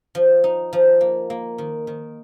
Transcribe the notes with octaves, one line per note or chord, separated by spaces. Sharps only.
F3
D#4
F3
A#3
A#3
D#3
D#3